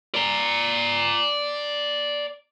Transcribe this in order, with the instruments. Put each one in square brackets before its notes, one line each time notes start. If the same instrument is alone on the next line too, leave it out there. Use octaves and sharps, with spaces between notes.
[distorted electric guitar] D5 A#5